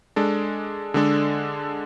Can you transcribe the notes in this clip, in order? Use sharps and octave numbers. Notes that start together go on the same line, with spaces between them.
G#3 D4 A4
D3 G#3 D4 A4